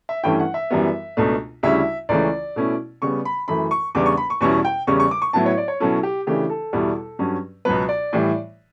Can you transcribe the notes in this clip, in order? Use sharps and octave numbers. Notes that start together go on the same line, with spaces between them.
E5
G2 E3 A3 C#4 E4 G5
F#5
E5
F#2 E3 G3 B3
C#2 B2 A3 D4
D2 C#3 G3 C#4 E4 E5
C#2 C#3 E3 A3 C#4 D5
B2 A3 C#4 E4
C#3 G3 B3 C#6
B5
F#2 E3 A3 B5
C#6
E2 C#3 G3 B3 D4 D6
C#6
B5
C#6
E2 B2 G3 C#4 E4 C#6
G5
E2 C#3 G3 C#4 C#6
C#6
D6
C#6
A2 F#3 B3 E4 A5
C#5
D5
C#5
B2 F#3 C#4 E4 A4
G4
C#3 E3 A3 D4 G4
A4
E2 B2 G3 B3 E4
G2 F#3 C#4
C#2 B2 F#3 B3 B4
D5
A2 E3 G3